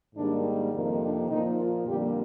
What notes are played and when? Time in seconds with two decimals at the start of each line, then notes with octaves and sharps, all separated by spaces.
0.15 G#2 D#3 G3 A#3 D4
0.72 F2 C3 D#3 A#3
1.01 D4
1.30 A#2 F3 A#3 D#4
1.59 F4
1.87 F2 D3 G3 A#3 G4